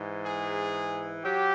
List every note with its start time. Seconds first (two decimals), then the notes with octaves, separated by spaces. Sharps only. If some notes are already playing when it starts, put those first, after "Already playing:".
Already playing: G#2 E3
0.26 G#4
1.24 F#3 G4